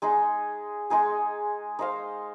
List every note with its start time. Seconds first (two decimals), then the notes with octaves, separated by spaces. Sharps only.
0.02 G#3 D#4 G#4
0.90 G#3 D#4 G#4
1.79 D#4 C5 F5